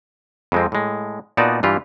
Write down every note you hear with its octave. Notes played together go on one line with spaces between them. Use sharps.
F2 G#3 C4
A2 G#3
A#2 B3 D#4 F#4 D5 A5
G2 E3 F4 G4